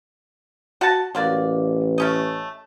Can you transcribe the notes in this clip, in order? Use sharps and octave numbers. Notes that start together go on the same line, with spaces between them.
F#4 F#5 A5
A1 F#3 A#3 D5
A3 C#4 D#5